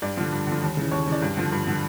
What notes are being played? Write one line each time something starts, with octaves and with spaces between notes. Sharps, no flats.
G2 D5
D3 F3
G2
D3 F3
D#2
C#3 E3
D#2 C#5
C#3 E3 D5
G2
D3 F3
G2
D3 F3